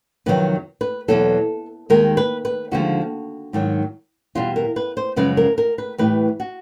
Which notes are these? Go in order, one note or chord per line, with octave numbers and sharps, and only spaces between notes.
F2 C3 D#3 F#3 B4
B4
E2 B2 F#3 A4
D#2 D#3 G#3 A#4
B4
B4
D#2 D3 F3 G#3 F#4
G#2 D#3 F#3
E2 B2 G3 F4
A#4
B4
C5
F#2 C#3 F3 G#3 B4
A#4
A#4
B4
A2 E3 G3 B4
F#4